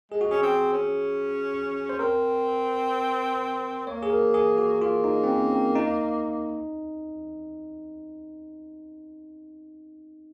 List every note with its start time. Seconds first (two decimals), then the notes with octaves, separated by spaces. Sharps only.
0.12 G#3 G#4
0.21 F#4
0.31 C#4 G#4
0.43 C4
0.74 C#4
1.89 C5
1.99 C4 A#4
3.87 A#3 C#5
4.03 G#4
4.10 A#4
4.34 G#4
4.58 F#4
4.81 A#3 F4
5.04 D#4
5.24 C4
5.28 C#4
5.51 C4
5.75 D#4